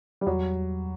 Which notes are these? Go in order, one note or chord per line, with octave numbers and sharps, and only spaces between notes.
G3
E2 F#3